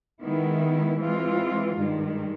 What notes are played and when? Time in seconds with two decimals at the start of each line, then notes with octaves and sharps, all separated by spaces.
0.22 D#3 G#3 B3 E4
0.99 E3 G#3 C4 F4
1.75 G2 D#3 G#3